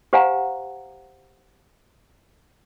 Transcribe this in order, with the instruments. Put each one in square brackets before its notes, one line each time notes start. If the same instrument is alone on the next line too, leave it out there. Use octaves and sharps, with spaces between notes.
[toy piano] G4 C5 F5 F#5 G#5 A#5